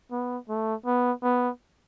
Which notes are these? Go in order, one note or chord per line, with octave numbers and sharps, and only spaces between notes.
B3
A3
B3
B3